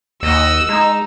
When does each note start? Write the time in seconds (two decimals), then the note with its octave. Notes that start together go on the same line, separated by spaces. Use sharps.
0.23 D#2 F#4 D#5 E6
0.69 G#3 D#4